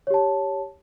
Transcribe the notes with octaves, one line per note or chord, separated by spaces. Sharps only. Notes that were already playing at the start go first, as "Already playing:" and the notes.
G4 C#5 A5